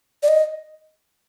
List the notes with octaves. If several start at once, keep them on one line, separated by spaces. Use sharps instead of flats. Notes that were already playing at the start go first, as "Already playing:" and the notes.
D5
D#5